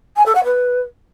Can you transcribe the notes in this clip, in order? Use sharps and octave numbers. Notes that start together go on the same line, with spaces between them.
G#5
A4
F#5
B4